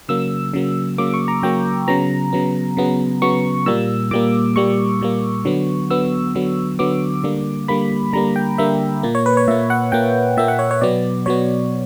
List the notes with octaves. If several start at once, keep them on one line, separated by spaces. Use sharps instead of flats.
C#3 F#3 A#3 E6
C#3 F#3 A#3
C#3 F#3 A#3 D6
C#6
A#5
C#3 F#3 A#3 G5
C#3 F#3 B3 A#5
C#3 F#3 B3
C#3 F#3 B3
C#3 F#3 B3 C#6
A#2 G3 A#3 E6
A#2 G3 A#3 D6
A#2 G3 A#3 C#6
A#2 G3 A#3
D3 F#3 B3
D3 F#3 B3 E6
D3 F#3 B3
D3 F#3 B3 D6
D3 G3 A#3
D3 G3 A#3 B5
D3 G3 A#3 A#5
G5
D3 G3 A#3 E5
A#2 A#3
C#5
B4
C#5
A#2 A#3 E5
F#5
A#2 A#3 G5
A#2 A#3 E5
F#5
C#5
C#5
B2 F#3 B3 D5
B2 F#3 B3 C#5